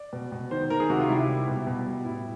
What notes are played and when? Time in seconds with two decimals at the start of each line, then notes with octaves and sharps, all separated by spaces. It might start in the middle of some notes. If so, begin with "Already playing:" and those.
Already playing: D5
0.13 B2
0.32 B2
0.51 D#3 C5
0.70 D#3 A#4
0.80 G#4
0.90 C3 F#4
1.00 F4
1.09 G3 E4
1.19 E4
1.28 G3
1.48 B2
1.67 B2
1.86 G3
2.05 A2 E4